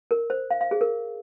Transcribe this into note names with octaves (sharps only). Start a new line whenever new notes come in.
A#4
C5
F5
F5
G#4
A#4